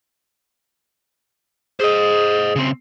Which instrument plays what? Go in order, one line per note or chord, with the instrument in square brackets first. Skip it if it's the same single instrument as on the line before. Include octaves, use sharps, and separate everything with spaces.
[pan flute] G#4 [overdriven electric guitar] C5 D#5
[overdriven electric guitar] C#3 C4